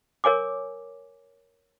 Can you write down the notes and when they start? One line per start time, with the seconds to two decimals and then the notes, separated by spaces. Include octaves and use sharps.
0.24 A#4 C#5 G#5 D6